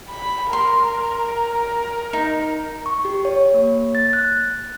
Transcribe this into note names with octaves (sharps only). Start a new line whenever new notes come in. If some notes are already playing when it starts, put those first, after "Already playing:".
B5
A#4 C6
D#4
C#6
G4
C#5
A#3
A6
F#6